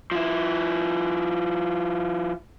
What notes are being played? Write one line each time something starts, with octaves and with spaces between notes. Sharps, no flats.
F3 E4